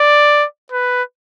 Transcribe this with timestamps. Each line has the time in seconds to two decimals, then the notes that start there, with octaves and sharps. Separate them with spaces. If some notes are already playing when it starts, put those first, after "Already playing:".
Already playing: D5
0.72 B4